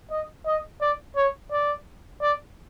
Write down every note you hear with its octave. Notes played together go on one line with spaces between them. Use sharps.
D#5
D#5
D5
C#5
D5
D5